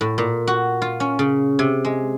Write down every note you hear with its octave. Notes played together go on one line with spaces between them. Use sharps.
A2
A#2
F#4
F4
C#4
C#3
C3
G#3